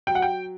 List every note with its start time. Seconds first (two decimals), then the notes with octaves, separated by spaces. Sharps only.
0.07 F#3 G5
0.15 F#5
0.22 G5